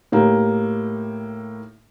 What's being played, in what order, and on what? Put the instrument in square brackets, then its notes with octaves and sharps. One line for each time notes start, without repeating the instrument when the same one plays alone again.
[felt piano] A2 A#3 G4